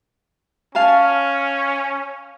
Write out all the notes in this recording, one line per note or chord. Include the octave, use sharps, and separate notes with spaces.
C#4 F5 G#5 A5